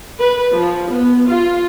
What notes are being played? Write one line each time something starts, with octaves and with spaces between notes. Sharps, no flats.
B4
F3
B3
F4